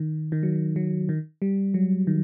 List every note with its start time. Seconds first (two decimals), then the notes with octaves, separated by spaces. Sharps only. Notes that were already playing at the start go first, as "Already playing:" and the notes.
Already playing: D#3
0.32 D#3
0.43 F#3
0.76 F#3
1.09 D#3
1.42 G3
1.74 F#3
2.07 D#3